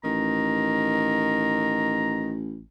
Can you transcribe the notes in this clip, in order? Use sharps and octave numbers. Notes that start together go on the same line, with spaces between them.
A1 D#3 A#5